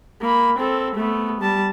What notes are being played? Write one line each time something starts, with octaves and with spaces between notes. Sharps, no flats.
A#3 B5
C4 A4
A3 B3
G3 A5